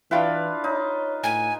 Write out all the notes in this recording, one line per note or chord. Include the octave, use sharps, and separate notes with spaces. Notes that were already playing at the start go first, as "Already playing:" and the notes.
E3 D4 E4 F4 B4 F5 G5
D#4 C#5
A2 G5 G#5